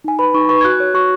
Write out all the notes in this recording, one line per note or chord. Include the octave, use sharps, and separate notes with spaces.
D#4 G#5
B4 B5
D#4 C#6
B4 C#6
G#6
F#4 F#6
C#5
F#4 C#6